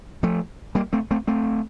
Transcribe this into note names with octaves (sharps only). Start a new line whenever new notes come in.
F3 A3
G3 A#3
A3 C4
A3 C4
A3 C4